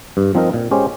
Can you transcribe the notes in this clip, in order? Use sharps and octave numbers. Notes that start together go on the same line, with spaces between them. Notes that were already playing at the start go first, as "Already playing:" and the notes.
G2
F3 C4 D#4 A#4
A#2
G#3 C#4 G4 C5